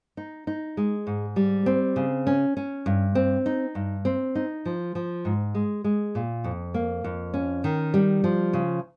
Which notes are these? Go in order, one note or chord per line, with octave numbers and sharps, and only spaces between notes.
D#4
D#4
G#3
G#2
G3
C4
C#3
C#4
C#4
G2
C4
D#4
G2
C4
D#4
F3
F3
G#2
G#3
G#3
A#2
F2
A#3
F2
C#4
D#3
G3
F3
C#3